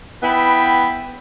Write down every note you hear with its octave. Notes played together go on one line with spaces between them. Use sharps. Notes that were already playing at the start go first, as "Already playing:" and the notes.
B3 E4 B4 G5